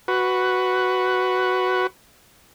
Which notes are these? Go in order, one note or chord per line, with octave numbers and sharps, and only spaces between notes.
F#4 B4